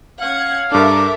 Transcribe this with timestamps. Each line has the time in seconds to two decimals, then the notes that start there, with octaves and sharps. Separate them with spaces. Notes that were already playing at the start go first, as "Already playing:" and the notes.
0.21 C#4 F5 F#5 G#6
0.72 G2 D4 A4 A#4 E5 D6